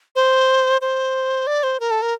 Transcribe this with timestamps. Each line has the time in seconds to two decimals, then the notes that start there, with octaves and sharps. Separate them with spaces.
0.16 C5
0.81 C5
1.47 D5
1.63 C5
1.80 A#4
1.91 A4
2.02 A#4